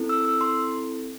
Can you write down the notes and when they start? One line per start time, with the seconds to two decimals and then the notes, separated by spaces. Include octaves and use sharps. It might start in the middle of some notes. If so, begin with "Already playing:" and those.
Already playing: C4 E4 A4
0.09 E6
0.25 E6
0.41 C6